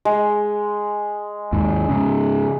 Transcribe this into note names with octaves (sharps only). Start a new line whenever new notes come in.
G#3
D#2 G#2
G#2 C#3